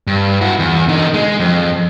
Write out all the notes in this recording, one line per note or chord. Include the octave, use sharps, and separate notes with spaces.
G2
E4 F#4
E2
D3 D#4
G#3
F2